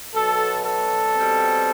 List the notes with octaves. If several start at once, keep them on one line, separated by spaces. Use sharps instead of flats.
B2 F#3 B3 A4
A4
B2 G3 C4